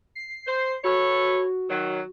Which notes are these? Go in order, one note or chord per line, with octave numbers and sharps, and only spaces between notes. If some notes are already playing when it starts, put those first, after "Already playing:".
C7
C5
F#4 A4 B4 C#5
D#3 F#3